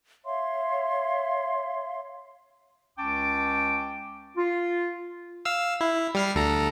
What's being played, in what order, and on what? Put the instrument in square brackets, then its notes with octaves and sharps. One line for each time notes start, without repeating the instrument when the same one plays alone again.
[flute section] C#5 E5 F5 C6
[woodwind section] C#2 C#4 G5 A5 D6
F4
[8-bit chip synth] F5 E6
E4
G3 F6 C7
D2 A4 A#5